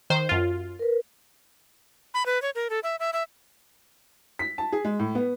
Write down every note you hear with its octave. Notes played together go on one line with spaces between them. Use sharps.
D#3 C5
F#2 F4
A#4 B4
B5
B4
C#5
A#4
A4
E5
E5
E5
B6
A5
G#4
G#3
A2
B3